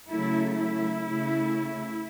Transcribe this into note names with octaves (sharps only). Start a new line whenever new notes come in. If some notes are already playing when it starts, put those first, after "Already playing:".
C#3 F#3 A3 E4
E4
C#3 A3